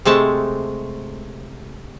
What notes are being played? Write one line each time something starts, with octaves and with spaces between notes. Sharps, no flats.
C3 G#3 A3 A5